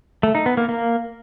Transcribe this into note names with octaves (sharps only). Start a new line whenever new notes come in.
A3
D#4
B3
A#3
A#3